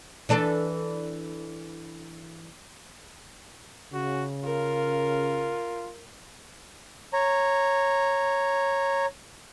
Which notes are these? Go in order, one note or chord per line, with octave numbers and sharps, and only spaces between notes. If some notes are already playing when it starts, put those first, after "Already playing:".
E3 D4 A4
C#3 F#4
F4 A#4
C#5 A#5